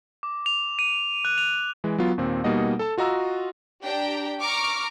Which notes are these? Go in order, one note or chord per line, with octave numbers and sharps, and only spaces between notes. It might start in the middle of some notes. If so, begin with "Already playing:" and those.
D6
F7
D#7
F#6
F7
E3 G#3
F#3 B3 F4
D#2 A#2 C4
B2 G3 A#3 D#4 D#5 F#5
A4 A5
F4 F#4 D#5 A#5 E6
D4 G4 G5 A#5
A#5 C#6 D6 F6